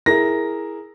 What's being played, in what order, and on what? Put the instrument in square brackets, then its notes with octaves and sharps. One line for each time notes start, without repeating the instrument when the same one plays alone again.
[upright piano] E4 G#4 A#4 [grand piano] A#6